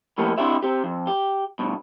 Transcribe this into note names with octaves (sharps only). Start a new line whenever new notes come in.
A2 F3 A#3 B3 G4
C4 D4 E4 F#4 G4 E5
C4 G4
F2
G4
G2 B2